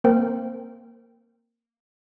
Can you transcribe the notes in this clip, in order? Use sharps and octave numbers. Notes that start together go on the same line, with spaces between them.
A#3 C4 A#4 C5 G5